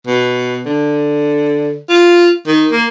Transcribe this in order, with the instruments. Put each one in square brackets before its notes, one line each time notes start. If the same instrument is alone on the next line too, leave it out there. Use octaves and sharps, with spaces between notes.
[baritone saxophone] B2
D3
F4
D#3
A#3